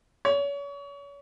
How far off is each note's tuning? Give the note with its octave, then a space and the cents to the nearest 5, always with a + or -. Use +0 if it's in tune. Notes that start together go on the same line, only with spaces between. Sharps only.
C#5 +35